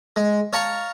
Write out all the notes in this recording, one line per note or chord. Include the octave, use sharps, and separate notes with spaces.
G#3
C#5 F5 A5 A#5 C#6